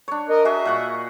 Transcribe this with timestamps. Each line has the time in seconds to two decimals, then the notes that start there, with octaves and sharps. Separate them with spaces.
0.08 D4 C#5
0.30 A#4 D#5
0.45 F#4 G#4 D#5 E5
0.65 A#2 F#5 C#6